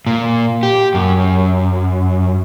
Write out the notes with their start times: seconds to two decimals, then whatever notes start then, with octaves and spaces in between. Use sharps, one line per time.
0.07 A#2
0.63 G4
0.94 F#2